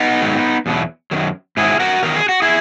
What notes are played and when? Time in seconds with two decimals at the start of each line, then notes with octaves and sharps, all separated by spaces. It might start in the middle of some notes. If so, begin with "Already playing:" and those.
Already playing: B3 D#4
0.20 G#2 D#3 F#3
0.66 E2 B2 F#3
1.11 F#2 D#3 F#3
1.57 G#2 D#3 F#3 E4 G#4
1.80 F#4 A#4
2.03 E2 D#3 F#3 A#4
2.16 G#4
2.29 F#4
2.42 E4 G#4